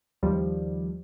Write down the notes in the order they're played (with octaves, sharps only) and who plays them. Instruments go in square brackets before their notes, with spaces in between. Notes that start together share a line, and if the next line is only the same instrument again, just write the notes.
[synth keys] D#2 F3 G3